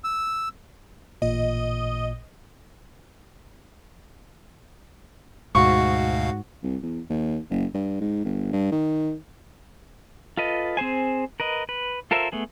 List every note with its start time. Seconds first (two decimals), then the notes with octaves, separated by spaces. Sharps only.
0.04 E6
1.22 A1 A#2 D#5
5.55 D2 G#2 B2 F#4 F5 C#6
6.63 C2
6.82 E2
7.10 D#2
7.50 F#1
7.74 G2
8.00 G#2
8.25 G1
8.52 G2
8.72 D#3
10.37 F4 A4 B4 D#5
10.77 C4 G#4 C5 G#5
11.40 A#4 B4 D#5
11.69 B4
12.11 F4 A4 A#4 C5 E5
12.32 A3 B3 G#4